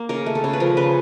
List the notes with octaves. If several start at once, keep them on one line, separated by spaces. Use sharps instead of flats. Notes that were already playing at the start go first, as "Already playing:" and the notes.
Already playing: A#3
C#3 A#4
A3
A4
C#3
B4
F3 A#4
C#3 B4